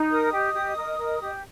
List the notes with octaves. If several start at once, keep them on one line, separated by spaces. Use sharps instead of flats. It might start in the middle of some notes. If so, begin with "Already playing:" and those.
Already playing: D#4
A#4 D#5 D#6
G4
G4
A#4
A#4
G4